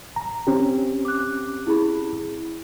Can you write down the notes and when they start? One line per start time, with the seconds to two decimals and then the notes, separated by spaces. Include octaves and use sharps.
0.16 A#5
0.47 C4 C#4 G4
1.05 D6 F#6
1.67 E4 G#4 B5